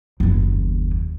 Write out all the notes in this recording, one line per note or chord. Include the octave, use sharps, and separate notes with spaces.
F#1 D#2